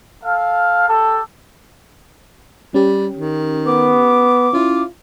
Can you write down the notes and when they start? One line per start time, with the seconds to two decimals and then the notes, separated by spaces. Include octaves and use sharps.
0.23 A4 F5
0.87 G4 A4
2.74 G3 C#4 G4
3.17 D#3
3.66 B3 D6
4.53 C#4 E4 F4